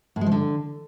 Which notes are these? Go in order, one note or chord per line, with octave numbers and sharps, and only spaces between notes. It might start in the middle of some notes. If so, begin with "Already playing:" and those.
A2
G#3
F3
D3